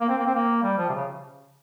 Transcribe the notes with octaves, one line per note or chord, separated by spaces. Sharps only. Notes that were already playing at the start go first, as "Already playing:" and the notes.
A#3
C4
A#3
C4
A#3
G3
F3
C3
C#3